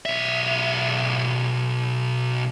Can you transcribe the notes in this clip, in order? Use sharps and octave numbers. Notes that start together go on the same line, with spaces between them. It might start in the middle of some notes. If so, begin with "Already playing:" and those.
B1 E5